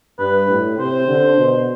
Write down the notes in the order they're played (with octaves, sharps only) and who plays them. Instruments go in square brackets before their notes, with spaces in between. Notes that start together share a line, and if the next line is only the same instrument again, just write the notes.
[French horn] G2 [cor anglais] B4
[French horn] A2
[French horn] C3 [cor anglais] C5
[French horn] D3
B2